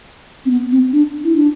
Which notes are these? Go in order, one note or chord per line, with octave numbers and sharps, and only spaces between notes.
C4
B3
C4
D4
E4
D4